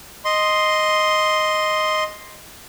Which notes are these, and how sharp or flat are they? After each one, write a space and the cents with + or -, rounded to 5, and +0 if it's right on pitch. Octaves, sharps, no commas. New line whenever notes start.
D#5 +0 C6 +0